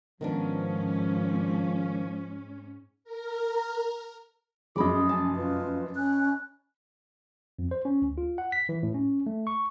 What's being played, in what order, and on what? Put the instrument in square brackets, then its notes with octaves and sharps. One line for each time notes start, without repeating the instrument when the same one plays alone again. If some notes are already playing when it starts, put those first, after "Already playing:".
[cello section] G#2 C#4 [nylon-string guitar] D#3 B3 D4 [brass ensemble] F3
[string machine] A#4
[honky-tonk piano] F1 F#2 [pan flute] G#4 [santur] D#5 B5 D6
[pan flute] G#5 [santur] A5
[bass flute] F4 [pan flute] B4
[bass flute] C#4 [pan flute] F#6
[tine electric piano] F2
C5
C#4
D2
F4
F#5
B6
E3
A2
C#4
A3
C#6